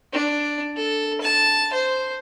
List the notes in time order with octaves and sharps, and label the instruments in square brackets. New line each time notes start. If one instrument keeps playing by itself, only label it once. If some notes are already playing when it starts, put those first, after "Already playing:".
[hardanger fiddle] D4
A4
A5
C5